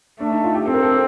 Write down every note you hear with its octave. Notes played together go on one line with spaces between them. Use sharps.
A3 D4
D#4
F4
G4
C4 A4
A#4
A4